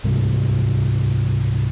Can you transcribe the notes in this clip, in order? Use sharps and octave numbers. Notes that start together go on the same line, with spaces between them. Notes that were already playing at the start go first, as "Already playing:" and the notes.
C#2 G#2 C3 G3